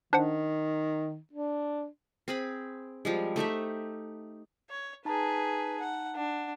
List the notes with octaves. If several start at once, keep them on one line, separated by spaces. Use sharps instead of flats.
D#3 D4 C5 F#5
D4
C4 G#4 B5
F3 G3 G#3
A3 D#4 G4 E5
C#5
D#4 G#4 B4 A5 A#5
F#5
D4 F#5